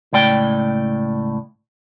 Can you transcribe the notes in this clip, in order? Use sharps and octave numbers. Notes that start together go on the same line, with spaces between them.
C#2 A2 D5 G5